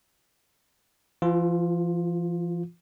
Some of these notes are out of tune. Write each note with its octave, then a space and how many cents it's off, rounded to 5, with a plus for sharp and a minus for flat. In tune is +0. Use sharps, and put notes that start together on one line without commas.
F3 -45 F4 +10